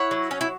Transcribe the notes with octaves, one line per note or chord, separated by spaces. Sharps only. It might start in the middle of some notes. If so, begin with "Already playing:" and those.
Already playing: E4 C#5 F#5
F#3
C#4
E4